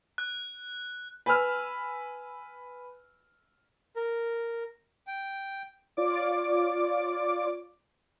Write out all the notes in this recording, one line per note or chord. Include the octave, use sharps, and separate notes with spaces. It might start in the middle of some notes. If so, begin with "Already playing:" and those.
F#6
B4 G#5 B5 E6 F6
A#4
G5
F4 C#5 D5 D6